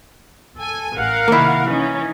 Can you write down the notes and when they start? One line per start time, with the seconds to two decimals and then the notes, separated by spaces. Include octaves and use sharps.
0.58 A4 G#5
0.97 A1 A#4 F5 F#5
1.28 C3 D#3 A#3 E4
1.68 E3 C#4 D#4